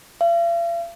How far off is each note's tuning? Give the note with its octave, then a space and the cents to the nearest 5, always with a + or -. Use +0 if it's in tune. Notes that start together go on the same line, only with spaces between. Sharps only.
F5 -45